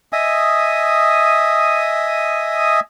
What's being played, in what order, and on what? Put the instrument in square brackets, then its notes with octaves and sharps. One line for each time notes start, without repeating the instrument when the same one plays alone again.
[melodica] D#5 E5 G#5 D#6